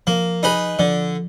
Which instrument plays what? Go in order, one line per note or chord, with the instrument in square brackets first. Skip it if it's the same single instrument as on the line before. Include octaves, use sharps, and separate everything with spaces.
[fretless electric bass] F3 [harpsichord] A#3
[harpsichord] D#4 G#4 B4
[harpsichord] D3 [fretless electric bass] F3